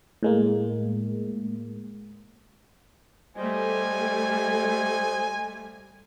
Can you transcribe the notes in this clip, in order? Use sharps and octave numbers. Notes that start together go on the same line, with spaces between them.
A2 G#3 A#3
G3 A3 C5 D#5 G#5